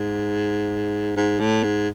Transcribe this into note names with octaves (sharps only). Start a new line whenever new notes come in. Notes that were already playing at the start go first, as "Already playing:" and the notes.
Already playing: G#2
G#2
A2
G#2